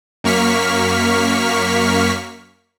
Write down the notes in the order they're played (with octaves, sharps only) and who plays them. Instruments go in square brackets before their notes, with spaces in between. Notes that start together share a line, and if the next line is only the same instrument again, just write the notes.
[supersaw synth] F#2 A#3 C#6 F6 B6